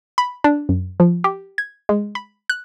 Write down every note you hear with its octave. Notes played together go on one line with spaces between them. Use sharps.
B5
D4
F#2
F3
G4
G#6
G#3
B5
F#6